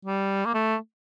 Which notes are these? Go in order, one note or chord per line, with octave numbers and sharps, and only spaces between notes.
G3
A#3
A3